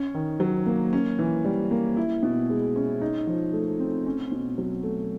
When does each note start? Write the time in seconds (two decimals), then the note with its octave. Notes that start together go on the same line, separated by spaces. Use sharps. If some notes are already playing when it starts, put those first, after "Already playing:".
Already playing: C#4
0.14 D#3
0.40 F#3
0.66 A#3
0.93 C#4
1.19 E3
1.45 G3
1.71 A#3
1.97 E4
2.23 B2
2.50 G#3
2.76 C#4
3.01 D#4
3.27 F3
3.53 A3
3.79 C4
4.06 C#4
4.32 B2
4.58 F#3
4.83 A3